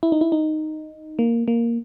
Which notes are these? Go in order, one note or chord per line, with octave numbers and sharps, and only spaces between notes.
E4
D#4
E4
D#4
A#3
A#3